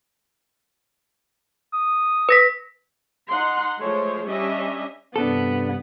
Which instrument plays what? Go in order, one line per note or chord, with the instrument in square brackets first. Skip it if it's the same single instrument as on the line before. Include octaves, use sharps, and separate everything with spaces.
[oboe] D#6
[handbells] B4 A#6 B6
[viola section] D#4 F#5 C6
F3 G#3 A3 C5 C#5
G3 C#4 D4 D#5 E5
[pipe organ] G2 C3 [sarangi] B3 [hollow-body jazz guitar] D4 A4